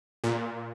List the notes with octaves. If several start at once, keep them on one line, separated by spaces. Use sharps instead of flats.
A#2